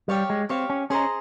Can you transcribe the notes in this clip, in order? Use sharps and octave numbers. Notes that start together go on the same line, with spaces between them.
G3 G4 C#5 F5
G#3
C4 G4 C#5 F5
C#4
C#4 G#4 C5 D#5 A#5